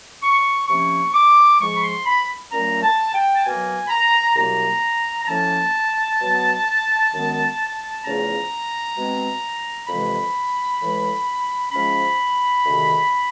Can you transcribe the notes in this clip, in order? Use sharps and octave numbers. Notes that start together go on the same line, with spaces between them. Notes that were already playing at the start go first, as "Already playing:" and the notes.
C#6
C3 F3 A#3 C#4 C#6
D6
G#2 F3 G#3 C#6
B5
C6
B5
A#2 F#3 A3 C#4 A#5
A5
G5
A5
B2 F#3 A#3 G#5
B5
A#5
C2 B2 F#3 A#3 A#5
A#5
A2 F3 A#3 C#4 A5
B2 F#3 B3
F#2 D#3 G#3 B3
E2 C#3 F3 A3 C#4 A#5
B2 G#3 C4
F2 C3 E3 G#3 B5
A2 E3 G#3
G#2 F3 G#3 C#4 B5
D2 C3 D#3 G#3